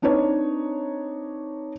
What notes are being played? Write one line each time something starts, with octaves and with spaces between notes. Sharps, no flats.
C4 D4 D#4 B4 C#5